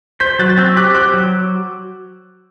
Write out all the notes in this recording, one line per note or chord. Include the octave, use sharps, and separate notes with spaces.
C5 G6 B6
F#3 F#6 A6
A6
C4 E6 G6
G4 D6 F#6
C5 D6 F#6
F#3